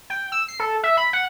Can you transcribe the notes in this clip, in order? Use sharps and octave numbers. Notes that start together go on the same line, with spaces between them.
G5
E6
C7
A4
E5
B5
F#5